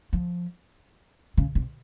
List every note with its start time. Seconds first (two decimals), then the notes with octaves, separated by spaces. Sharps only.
0.13 F3
1.37 C#3
1.55 C3